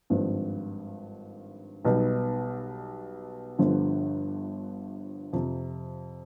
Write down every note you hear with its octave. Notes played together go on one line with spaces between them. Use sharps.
G#1 G2 F3
B1 B2 G3 B3 D#4
G1 G2 D3 F3
F2 C3 F3